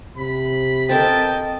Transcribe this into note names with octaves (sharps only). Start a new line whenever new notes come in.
C3 B5
C4 A4 A#4 D#5 G5 A5